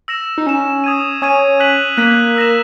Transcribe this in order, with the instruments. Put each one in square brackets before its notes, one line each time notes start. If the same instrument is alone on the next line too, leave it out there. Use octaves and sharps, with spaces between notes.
[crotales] E6 A#6 E7
[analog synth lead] D#4
[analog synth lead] C#4 [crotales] E6 A#6 E7
[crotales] D#6 G#6 D#7
[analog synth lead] C#4 [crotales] D#6 G#6 D#7
[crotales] F#6 B6 D#7 F#7
[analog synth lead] A#3 [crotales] F#6 B6 D#7 F#7
[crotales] E6 A#6 E7